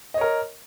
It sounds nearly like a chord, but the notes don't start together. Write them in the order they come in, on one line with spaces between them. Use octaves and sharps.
D#5 C#5 A#4